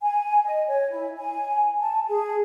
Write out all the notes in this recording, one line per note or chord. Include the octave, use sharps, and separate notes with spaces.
G#5
D#5
C#5
E4
G#5
A5
G#4